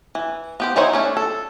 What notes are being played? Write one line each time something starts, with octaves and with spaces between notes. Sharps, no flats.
E3
B3 G4 C5
F#3 D#4 E4 C5 C#5
A3 C#4 D4
A4